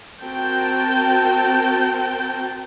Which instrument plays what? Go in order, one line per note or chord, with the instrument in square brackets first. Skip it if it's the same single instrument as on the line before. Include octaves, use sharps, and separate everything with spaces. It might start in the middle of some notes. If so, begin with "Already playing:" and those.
[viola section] C4 F#4 A#4 G5 A5